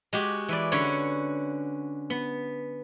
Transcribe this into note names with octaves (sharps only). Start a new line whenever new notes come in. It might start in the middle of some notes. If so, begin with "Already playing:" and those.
G#3 F#4 G4
E3 B4 D5
D3 C#4 F#4 B4 C#5
B3